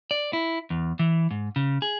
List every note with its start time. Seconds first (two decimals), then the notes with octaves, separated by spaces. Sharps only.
0.11 D5
0.33 E4
0.70 E2
0.99 E3
1.31 G#2
1.56 C#3
1.82 G#4